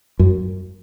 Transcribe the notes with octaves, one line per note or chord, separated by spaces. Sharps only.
F#2